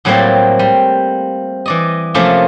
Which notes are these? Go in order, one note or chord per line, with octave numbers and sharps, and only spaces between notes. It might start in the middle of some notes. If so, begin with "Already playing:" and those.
A2 F#3 G3 A3 A#3 C4
G3
E3 D5 D#5
C3 F3 A3 A#3 C#4 F4